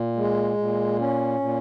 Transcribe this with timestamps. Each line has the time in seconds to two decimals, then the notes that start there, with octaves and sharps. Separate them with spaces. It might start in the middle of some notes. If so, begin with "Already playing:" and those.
Already playing: A#2
0.15 G#3
0.57 A#2
0.99 C#4
1.40 A#2